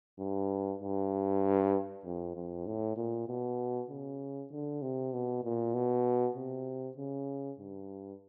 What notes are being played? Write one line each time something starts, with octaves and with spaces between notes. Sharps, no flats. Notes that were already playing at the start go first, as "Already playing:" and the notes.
G2
G2
F2
F2
A2
A#2
B2
C#3
D3
C3
B2
A#2
B2
C3
C#3
G2